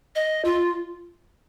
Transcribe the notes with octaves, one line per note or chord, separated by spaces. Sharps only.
D#5
F4